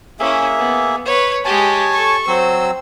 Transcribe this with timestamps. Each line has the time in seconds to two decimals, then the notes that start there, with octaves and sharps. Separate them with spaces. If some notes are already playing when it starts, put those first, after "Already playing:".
0.20 A#3 C#4 E4 G#4 E5
0.58 B3
1.05 B4 C#5
1.45 G#3 G4 C#5 G#5 A5
1.93 A4 C#6
2.27 F#3 C4 C5 E6